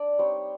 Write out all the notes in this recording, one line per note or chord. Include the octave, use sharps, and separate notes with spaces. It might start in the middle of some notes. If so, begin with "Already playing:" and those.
Already playing: D4 D5
G3 C4 D#4 C#5